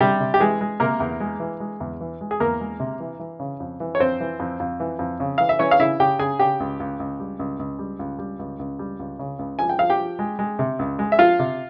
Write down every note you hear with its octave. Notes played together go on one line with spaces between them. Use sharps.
C3 G3 G4
C3
G4
E3 G#3 G#4
G#3
C3 A#3 A#4
E2
G#3
E3
G#3
E2
E3
G#3
G#4
E2 A#3 A#4
G#3
C3
E3
E3
C#3
F2
E3
C#5
F2 C4 C5
E3
F2
F2
E3
F2
C#3
E3 F5
E5
E3 C#4 C#5
F5
C#3 E4 E5
C#3 G4 G5
C#3 G#4 G#5
C#3 G4 G5
C#2
C#2
C#2
G3
C#2
C#2
G3
C#2
G3
C#2
C#2
G3
C#2
C#3
C#2
F3 G#5
G5
F3 F5
G4 G5
F3
G#3
G#3
C3
C#2
G#3
E5
F3 F4 F5
C3